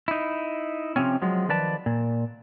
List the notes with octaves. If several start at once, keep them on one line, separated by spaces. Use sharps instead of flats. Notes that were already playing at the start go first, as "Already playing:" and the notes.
D#4 E4
C3 F3 C4 C#4
F3 F#3 G#3
D#3 F3 B4 D5 A5
A#2